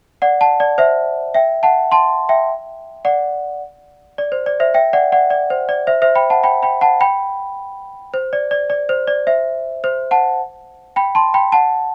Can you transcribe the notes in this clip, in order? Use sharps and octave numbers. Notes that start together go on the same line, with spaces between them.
D5 F#5
F#5 A5
D5
C5 E5
E5 G5
F#5 A5
A5 C6
E5 G5
D5 F#5
D5
C5
D5
C5 E5
E5 G5
D5 F#5
D5 F#5
D5
C5
D5
C5 E5
C5 E5
G5 B5
F#5 A5
G5 B5
G5 B5
F#5 A5
G5 B5
C5
D5
D5
D5
C5
D5
C5 E5
C5
F#5 A5
G5 B5
A5 C6
G5 B5
F#5 A5